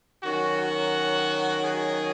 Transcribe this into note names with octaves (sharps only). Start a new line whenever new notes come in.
D#3 F#3 C#4 F#4
F#4
G#4